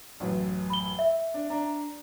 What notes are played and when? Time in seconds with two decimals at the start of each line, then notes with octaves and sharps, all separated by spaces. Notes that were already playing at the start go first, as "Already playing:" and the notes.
0.20 A1 F#2 E3
0.70 B5 G7
0.99 E5
1.34 D4
1.50 D4 A#5